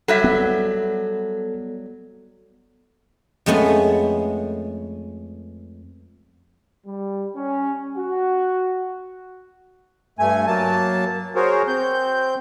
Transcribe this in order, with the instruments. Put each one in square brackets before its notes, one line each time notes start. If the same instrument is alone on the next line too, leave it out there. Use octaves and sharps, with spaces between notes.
[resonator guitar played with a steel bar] F#3 G3 E5 [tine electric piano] A4
[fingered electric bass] B3
[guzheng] F2 G#3 A3 B3 C#4
[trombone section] G3
C#4
F#4
[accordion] G2 A3 G#5
F#3 A#3 A5
F#4 G#4 A#4 C5 C#5
C4 G6